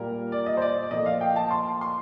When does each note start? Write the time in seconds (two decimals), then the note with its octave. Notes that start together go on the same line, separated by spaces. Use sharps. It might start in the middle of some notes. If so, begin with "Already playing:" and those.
Already playing: A#2 G3 A#4
0.32 D5
0.46 D#5
0.57 C5
0.62 D5
0.91 A#2 F3 A3 D#5
1.06 F5
1.21 G5
1.36 A5
1.51 C6
1.81 C6